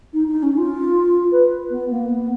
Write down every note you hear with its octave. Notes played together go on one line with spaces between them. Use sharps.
D#4
D#4
C#4
F4
B4
B3
A#3
B3